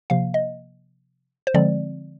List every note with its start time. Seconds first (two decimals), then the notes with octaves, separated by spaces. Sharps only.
0.10 C3 F3 A#3 F5
0.34 D#5
1.47 C5
1.54 D3 F3 G#3 C4 D5